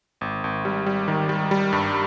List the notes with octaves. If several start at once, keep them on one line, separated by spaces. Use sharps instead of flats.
G#1
G#1
G3
G3
D#3
G3
G3
G2